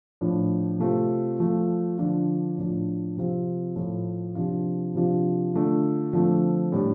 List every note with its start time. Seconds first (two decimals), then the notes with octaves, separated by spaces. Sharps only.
0.21 A2 F3 D4
0.79 C3 A3 C4 F4
1.39 F3 A3 F4
1.98 D3 F3 D4 F4
2.57 A2 F3 D4 F4
3.17 C3 F3 C4 F4
3.76 A2 F3 A3 F4
4.35 C3 F3 D4 F4
4.95 C3 F3 D4 F4
5.54 D3 A3 D4 F4
6.13 D3 F3 A3 C4
6.72 A2 G3 D4